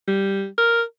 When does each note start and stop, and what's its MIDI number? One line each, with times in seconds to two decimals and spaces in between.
0.08 0.46 55
0.58 0.82 70